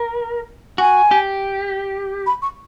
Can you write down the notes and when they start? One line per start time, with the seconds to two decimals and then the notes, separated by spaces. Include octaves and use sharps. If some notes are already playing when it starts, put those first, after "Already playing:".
Already playing: A#4
0.78 F#4 G#5
1.11 G4
2.26 B5
2.42 C#6